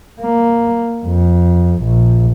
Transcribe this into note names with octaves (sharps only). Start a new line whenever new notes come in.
A#3
F2
A#1